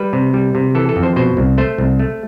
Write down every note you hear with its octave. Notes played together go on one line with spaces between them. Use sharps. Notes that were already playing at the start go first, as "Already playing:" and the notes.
Already playing: G3 B4
C3
G3
C3
E3 A4
A4
F2
C5
B2 C5
C2
A3 C5
C2
A3